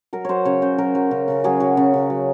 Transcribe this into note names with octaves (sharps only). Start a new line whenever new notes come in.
F#3 A#4
F#3 C5 C#5
C#3 C#5
C#3 C5
F#3 A#4
F#3
C#3
C#3
F#3 G#4
F#3
C#3
C#3
F#3